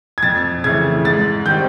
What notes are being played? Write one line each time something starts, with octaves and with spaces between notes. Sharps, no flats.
G#6
F2 A6
C#3 E3 A3 G#6
G#2 A6
D#3 G3 C4 G6